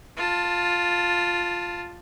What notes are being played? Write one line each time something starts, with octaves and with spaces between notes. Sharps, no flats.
F4 A5